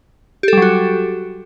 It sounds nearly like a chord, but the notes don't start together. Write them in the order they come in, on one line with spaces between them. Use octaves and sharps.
G4 A4 G3 F#3 F#4